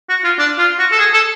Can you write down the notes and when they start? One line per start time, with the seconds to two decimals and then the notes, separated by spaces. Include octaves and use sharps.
0.09 F#4
0.24 F4
0.39 D4
0.58 F4
0.79 F#4
0.92 A4
0.99 G#4
1.14 A4